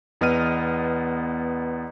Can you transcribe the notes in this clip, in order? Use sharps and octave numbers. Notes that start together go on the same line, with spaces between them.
E2 B3 D#5 F6 D#7